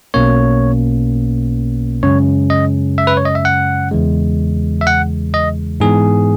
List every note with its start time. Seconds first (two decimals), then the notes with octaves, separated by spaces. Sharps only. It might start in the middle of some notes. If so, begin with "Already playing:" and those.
0.14 B1 B2 A#3 C#4 C#5
2.03 F#2 C#3 G#3 C#4 C#5
2.50 D#5
2.98 E5
3.07 B4
3.17 C#5
3.25 D#5
3.35 E5
3.45 F#5
3.91 E2 C#3 E3 G#3
4.81 E5
4.87 F#5
5.34 D#5
5.80 G#2 E3 B3 G#4